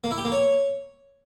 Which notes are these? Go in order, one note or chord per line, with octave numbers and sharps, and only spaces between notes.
A#3
E4
G4
A#3
C#5